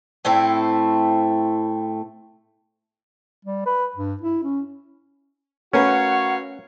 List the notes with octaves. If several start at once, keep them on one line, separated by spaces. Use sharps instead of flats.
A2 A3 C4 E4
G3
B4
G2
E4
C#4
A3 C#4 F#4 A#4 B4 C#5 F5 F#5